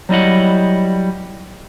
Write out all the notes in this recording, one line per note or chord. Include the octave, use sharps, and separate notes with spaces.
F#3 G3 E4 D#5 F#5